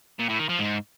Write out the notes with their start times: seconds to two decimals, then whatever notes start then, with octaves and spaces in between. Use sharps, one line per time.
0.19 A#2
0.29 A2
0.39 D#3
0.49 F3
0.59 G#2